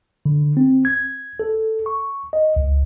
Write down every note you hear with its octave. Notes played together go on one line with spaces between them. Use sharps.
D3
C4
G#6
A4
C#6
D#5
C#2